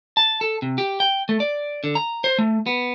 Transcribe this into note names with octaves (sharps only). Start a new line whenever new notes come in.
A5
A4
C3
G4
G5
A3
D5
D3
A#5
C5
A3
B3